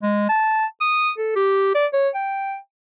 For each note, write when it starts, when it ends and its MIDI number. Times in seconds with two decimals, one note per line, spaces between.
0.03 0.27 56
0.29 0.66 81
0.81 1.11 87
1.18 1.34 69
1.36 1.73 67
1.75 1.86 74
1.93 2.09 73
2.15 2.57 79